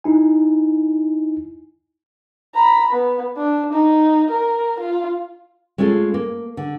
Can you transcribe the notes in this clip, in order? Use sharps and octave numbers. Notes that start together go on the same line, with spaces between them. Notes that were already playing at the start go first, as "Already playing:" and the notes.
D#4 E4 G#5
A#5 B5
B3
D4
D#4
A#4
F4
G#3 A3 C#4 F4 A4
A#3
D3